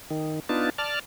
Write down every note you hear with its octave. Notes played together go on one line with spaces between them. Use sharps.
D#3
B3 D4 D#4 F4 A5
D5 A5 F6